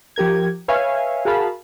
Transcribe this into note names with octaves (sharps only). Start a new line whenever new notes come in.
F3 G4 A#4 G#6
B4 C#5 E5 F5 G#5
F#4 G#4 A#4 F5 A5 B5